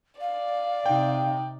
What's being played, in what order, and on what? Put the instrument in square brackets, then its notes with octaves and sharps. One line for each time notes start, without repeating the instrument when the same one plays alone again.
[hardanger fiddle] D5 [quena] F5
[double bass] C3 D#4 [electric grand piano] G5